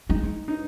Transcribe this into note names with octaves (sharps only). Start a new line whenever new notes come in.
G#3 D#4
D#4